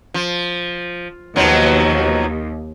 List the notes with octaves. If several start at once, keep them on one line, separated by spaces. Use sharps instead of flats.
F3
D#2 B2 F3 F#3